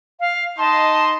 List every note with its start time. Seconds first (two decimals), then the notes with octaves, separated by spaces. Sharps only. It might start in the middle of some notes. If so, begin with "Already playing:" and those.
0.20 F5
0.59 D#4 D#5 A5 C6